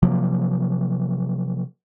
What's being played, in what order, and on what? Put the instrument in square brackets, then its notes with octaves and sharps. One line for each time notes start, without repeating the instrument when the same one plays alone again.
[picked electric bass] C3 F3 F#3 A#3